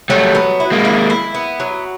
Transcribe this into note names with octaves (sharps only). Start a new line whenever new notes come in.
F#3 G3 A3
B3
E4
G#3 A#3
E4
E4
B3
F#3